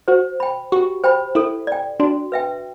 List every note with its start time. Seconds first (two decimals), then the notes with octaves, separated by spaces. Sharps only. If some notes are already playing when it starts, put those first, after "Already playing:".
0.08 F#4 C5
0.40 G5 B5
0.72 F#4 G4
1.04 C5 G5 B5
1.35 E4 A4
1.67 D5 G5
2.00 D4 F#4
2.32 B4 E5 G5